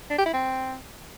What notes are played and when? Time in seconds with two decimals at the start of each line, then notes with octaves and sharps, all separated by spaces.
0.11 D4
0.18 G4
0.26 E4
0.33 C4